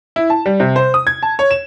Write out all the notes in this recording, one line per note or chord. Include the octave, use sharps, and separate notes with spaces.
E4
A5
G3
C3
C5
D#6
G#6
A5
C#5
E7